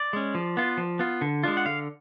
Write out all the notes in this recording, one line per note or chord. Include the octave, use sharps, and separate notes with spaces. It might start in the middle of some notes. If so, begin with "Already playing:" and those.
Already playing: D5
G#3 C#4
F3
B3 F4
F3
B3 F4
D3
G#3 D4 F4
F#5
D3 F5